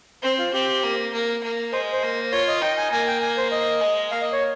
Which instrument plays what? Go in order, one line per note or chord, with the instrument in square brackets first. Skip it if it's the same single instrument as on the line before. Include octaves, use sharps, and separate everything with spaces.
[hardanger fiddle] C4 [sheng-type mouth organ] C5
[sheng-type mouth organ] F4
[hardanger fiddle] C4 [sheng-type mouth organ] G4
[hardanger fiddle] A#3
A#3
A#3
[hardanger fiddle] G#3 [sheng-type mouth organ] C5
[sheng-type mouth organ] C5
[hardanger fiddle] A#3
[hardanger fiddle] F4 [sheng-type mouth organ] C#5
[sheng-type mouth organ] D#5
[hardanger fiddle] D#4 [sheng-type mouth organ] G5
[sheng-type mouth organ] G#5
[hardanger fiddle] A#3 [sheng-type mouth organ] G#5
[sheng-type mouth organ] G5
G#5
C5
D#5
[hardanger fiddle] G#3
[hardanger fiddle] A#3 [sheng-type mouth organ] F5
[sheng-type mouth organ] D#5
C#5